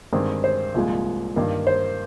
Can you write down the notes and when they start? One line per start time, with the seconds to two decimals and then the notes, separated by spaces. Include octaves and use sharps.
0.12 G2 D#3 G#3 C4
0.44 C5
0.74 C2 A#2 F3 G#3
1.36 G2 D#3 A#3
1.67 C5